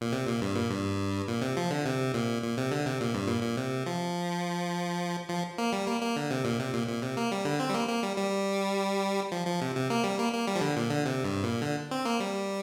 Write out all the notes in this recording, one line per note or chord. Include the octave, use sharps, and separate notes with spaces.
A#2
C3
A#2
G2
A#2
G2
A#2
C3
F3
D3
C3
A#2
A#2
C3
D3
C3
A#2
G2
A#2
A#2
C3
F3
F3
A#3
G3
A#3
A#3
D3
C3
A#2
C3
A#2
A#2
C3
A#3
G3
D3
C4
G3
A#3
A#3
G3
G3
F3
F3
C3
C3
A#3
G3
A#3
A#3
G3
F3
D3
A#2
D3
C3
G2
A#2
D3
C4
A#3
G3